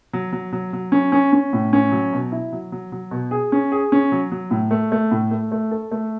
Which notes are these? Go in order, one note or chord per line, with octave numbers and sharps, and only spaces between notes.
F#3
F#3
F#3
F#3
C#4
C#4
C#4
A2
C#4
F#3
B2
E4
F#3
F#3
F#3
B2
G#4
C#4
G#4
C#4
F#3
F#3
A2
A3
A3
A2
A3
A3
A4
A3